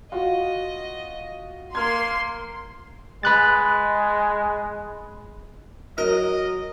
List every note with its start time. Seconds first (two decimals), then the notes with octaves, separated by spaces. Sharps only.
0.12 F4 F#4 D#5
1.75 A#3 C6 F6 G#6
3.23 G#3 B5 F#6 A6
5.98 F#3 A#4 D#5